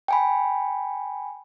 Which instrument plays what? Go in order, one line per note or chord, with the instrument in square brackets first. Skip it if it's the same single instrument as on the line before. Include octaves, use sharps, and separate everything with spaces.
[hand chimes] G5 G#5 B5